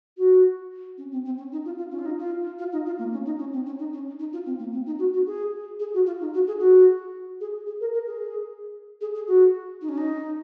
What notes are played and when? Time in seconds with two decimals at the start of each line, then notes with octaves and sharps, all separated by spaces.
0.18 F#4
0.98 C#4
1.12 C4
1.25 C4
1.38 C#4
1.52 D#4
1.65 F4
1.78 F4
1.92 C#4
1.99 F4
2.06 D#4
2.19 F4
2.59 F4
2.72 D#4
2.86 F4
2.99 A#3
3.13 C#4
3.26 D#4
3.39 C#4
3.53 C4
3.66 C#4
3.79 D#4
3.93 C#4
4.19 D#4
4.33 F4
4.46 C4
4.59 A#3
4.73 C4
4.86 D#4
4.99 F#4
5.13 F#4
5.26 G#4
5.80 G#4
5.94 F#4
6.06 F4
6.21 D#4
6.34 F#4
6.47 G#4
6.60 F#4
7.41 G#4
7.67 G#4
7.80 A#4
7.94 A#4
8.07 G#4
9.01 G#4
9.15 G#4
9.27 F#4
9.82 D#4
9.89 C#4
9.98 D#4